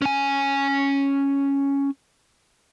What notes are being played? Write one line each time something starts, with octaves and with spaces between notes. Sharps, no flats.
C#4 G#5